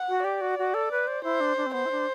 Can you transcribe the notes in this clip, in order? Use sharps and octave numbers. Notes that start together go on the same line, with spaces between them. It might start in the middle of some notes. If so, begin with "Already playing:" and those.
Already playing: F#5
F#4
G4 D5
F#4
F#4
A4
B4
C5
E4 C5
D4
D4
C4
B3 C5
E4
D4